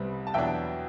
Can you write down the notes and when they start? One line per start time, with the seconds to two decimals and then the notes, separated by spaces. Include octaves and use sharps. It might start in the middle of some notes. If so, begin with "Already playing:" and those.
Already playing: C2 C3 G3 B3
0.27 A5
0.34 E2 B2 F#3 B3 D4 E5 G5